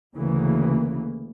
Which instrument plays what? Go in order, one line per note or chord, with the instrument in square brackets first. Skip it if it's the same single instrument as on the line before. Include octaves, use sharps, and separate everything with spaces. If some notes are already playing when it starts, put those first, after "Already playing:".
[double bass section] D2 C#3 E3 A#3